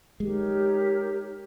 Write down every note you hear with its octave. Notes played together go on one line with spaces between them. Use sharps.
G#3 D#4 G4 A#4 C#5